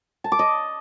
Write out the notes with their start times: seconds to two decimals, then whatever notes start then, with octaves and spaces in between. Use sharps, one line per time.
0.24 A5
0.32 D6
0.39 D#5